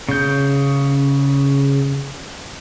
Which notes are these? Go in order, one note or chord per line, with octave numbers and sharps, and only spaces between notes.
C#3 G6